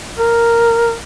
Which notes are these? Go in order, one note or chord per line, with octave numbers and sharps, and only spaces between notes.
A#4